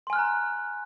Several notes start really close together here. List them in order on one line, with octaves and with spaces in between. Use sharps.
C6 G#5 F6 F#6 A#5